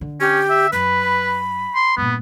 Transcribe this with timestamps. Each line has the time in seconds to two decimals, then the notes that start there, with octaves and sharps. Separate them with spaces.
0.01 D3
0.21 C#4 G4
0.50 E5
0.73 F#2 B4 B5
1.75 C6
1.97 G2 A#2 B3